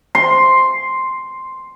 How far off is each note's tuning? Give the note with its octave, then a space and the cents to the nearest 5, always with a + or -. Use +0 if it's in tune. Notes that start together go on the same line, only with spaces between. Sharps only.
C6 +0